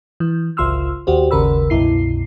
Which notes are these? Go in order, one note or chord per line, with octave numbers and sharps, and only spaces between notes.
E3
G1 C#2 F4 C6 E6 F6
D#2 F#4 G4 C5
G#1 D#2 C#3 A#4 B5 E6
C2 F#2 B2 E4 C7